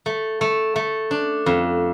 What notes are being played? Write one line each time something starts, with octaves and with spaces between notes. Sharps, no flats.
A3
A3
A3
D4
F2